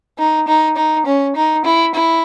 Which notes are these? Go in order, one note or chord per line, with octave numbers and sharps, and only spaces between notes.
D#4
D#4
D#4
C#4
D#4
E4
E4